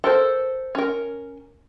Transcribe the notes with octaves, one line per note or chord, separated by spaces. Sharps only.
A4 A#4 C5
C#4 A#4